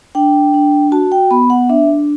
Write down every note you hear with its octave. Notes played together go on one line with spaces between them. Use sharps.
D4 G5
D4
F#4 A5
G5
B3 B5
F#5
D4 E5